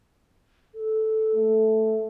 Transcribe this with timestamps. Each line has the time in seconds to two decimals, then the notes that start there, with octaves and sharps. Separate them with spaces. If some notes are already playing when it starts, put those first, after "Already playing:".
0.74 A4
1.35 A3